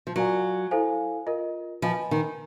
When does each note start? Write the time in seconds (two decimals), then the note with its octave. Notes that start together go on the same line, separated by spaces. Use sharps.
0.07 F3
0.16 F#3 F4 A#4 D5 F5 G#5
0.71 E4 A4 C5 F5 G#5
1.27 F4 A#4 D#5
1.82 F3 B4 D#5 G#5 B5
2.11 D#3